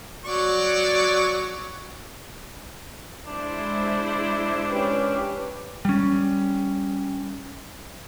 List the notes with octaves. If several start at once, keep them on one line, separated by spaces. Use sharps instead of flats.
F#3 D5 C#6
G#3 D4 E4 C5
C#4 G4 B4
G3 C#4